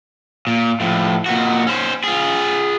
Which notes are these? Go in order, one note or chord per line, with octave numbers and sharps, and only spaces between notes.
A#2
A2 F3
A#2 F#4
C#4 C5
F4 G#4